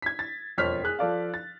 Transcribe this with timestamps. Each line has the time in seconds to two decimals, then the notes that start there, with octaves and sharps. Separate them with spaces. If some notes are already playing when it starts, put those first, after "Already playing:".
0.02 G#6 B6
0.19 A6
0.57 E1 F2 C5 C#5 F6 B6
0.84 G#4 F#6
0.99 F3 A4 D5 F5
1.34 A6